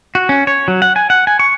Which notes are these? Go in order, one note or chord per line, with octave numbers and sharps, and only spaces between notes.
F#4
C#4
C#5
F#3
F#5
G#5
F#5
G#5
C#6